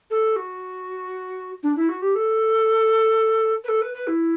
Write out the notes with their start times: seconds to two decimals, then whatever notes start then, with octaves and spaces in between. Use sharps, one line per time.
0.10 A4
0.36 F#4
1.63 D4
1.76 E4
1.89 F#4
2.02 G4
2.15 A4
3.64 B4
3.68 A4
3.82 B4
3.94 B4
4.07 E4